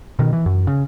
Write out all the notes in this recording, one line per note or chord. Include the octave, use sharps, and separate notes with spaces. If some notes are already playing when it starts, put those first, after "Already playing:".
B2 D#3
E3
F#2
C#3